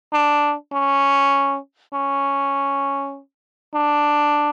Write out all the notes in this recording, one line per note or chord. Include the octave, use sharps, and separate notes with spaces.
D4
C#4
C#4
D4